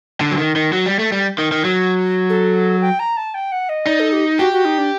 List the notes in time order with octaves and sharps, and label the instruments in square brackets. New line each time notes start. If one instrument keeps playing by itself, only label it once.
[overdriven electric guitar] D3
F#3
D#3
D#3
F#3
G3
A3
G3
D#3
D#3
F#3
[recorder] A4
G5
A#5
A5
G5
F#5
D#5
[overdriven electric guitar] D#4 [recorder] D5
[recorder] A4
G4
[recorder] F#4 [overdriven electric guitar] G4
[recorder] F#4
D#4
D4